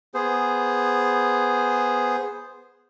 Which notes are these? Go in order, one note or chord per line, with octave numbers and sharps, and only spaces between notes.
B3 G#4 C5